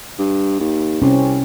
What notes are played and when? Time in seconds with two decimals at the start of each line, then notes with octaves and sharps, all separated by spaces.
0.19 G2
0.60 D#2
1.02 C2 C3 C4 C#4